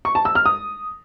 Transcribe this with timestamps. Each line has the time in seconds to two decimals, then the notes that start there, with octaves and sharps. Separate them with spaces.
0.05 C#6
0.15 A5
0.25 E6
0.35 F6
0.46 D#6